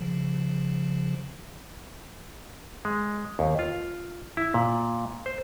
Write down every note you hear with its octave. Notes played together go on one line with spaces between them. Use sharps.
C#3 F3
G#3
D#2
F4
E4
A#2
C5